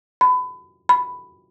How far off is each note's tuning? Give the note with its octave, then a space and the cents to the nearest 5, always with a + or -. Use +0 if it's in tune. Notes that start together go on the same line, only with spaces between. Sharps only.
B5 +30
B5 +5